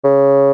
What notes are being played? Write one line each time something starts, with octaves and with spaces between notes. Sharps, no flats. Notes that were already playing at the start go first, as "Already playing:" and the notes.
C#3